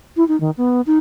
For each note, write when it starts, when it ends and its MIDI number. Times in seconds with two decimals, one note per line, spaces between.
0.17 0.26 64
0.28 0.39 63
0.40 0.51 51
0.57 0.81 59
0.86 0.98 63